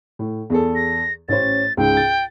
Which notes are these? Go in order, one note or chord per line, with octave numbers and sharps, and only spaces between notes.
A2
E2 G#4 A4
A#6
A1 C#4 C5 A6
C#2 G#2 G5
A6